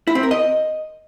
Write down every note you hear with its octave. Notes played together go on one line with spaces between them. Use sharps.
E4
C4
A#4
D#5